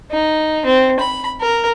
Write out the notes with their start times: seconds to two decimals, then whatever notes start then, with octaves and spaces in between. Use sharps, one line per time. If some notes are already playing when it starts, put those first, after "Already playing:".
0.11 D#4
0.65 C4
0.99 B5
1.41 A#4